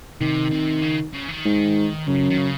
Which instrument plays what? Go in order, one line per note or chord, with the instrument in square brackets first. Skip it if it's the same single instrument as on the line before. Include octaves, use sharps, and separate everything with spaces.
[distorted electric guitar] C3 [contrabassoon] D#3
[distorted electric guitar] C3
C#3
C#3
D#3
[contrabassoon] G#2
[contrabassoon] F#2 [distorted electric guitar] C#3
[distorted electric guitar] D#3
C#3